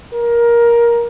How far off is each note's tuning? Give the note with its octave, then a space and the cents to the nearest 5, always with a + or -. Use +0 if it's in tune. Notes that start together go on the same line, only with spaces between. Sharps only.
A#4 +15